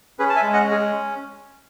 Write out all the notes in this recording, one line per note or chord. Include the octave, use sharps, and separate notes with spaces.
C#4 G#4 B4
A5
E5 G#5
G#3
D#5 F#5
C#4
G#4